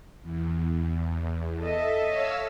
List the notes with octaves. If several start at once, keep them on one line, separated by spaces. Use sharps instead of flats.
E2
A4 D#5 E5
C#5 F5 E6